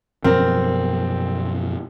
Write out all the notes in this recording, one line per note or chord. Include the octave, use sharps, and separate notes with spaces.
F#2 B2 F3 C4 A#4